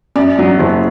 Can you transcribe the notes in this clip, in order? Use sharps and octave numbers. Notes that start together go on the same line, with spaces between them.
F#2 D5
F#3
F#1